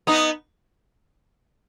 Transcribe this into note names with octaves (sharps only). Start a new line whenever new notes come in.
B3 D#4